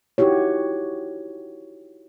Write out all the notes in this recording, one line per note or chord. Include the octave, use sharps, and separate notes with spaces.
D#4 E4 F#4 G4 C#5